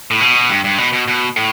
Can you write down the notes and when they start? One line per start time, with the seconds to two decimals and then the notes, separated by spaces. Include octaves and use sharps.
0.11 A2
0.20 B2
0.49 G2
0.64 G2
0.78 B2
0.93 B2
1.08 B2
1.36 A2